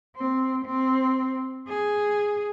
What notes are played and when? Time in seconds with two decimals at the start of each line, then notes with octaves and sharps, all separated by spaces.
0.16 C4
0.65 C4
1.68 G#4